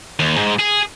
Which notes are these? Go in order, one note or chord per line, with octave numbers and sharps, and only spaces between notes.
D#2
G#2
G#4